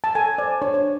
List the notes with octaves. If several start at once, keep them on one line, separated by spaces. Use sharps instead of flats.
A5
A4 G#5
C5 D5
D4 C#5
C#5